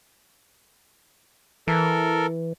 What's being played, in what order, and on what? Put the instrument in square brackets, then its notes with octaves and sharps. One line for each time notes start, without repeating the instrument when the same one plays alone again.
[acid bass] E3 [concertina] A4 A#4